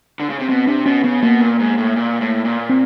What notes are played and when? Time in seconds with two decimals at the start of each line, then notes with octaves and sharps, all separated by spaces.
0.20 D3
0.30 C#3
0.39 C3
0.49 B2 C4
0.67 C3 D4
0.86 B2 C#4
1.04 C#3 B3
1.22 B2 A#3
1.41 A#2
1.59 G#2
1.78 A2
1.96 A#2
2.21 A2
2.45 A#2
2.69 C4